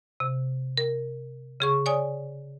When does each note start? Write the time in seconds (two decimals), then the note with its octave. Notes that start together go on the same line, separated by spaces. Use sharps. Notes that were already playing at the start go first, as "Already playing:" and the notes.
0.20 C3
0.77 A#4
1.60 C#3 G#4 C#6
1.86 C#5 D5 G#5 D#6